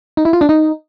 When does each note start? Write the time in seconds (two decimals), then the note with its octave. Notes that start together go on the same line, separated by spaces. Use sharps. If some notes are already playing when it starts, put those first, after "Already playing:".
0.17 D#4
0.25 E4
0.33 F4
0.41 D4
0.49 D#4